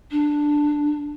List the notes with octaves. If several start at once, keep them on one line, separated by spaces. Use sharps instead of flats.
D4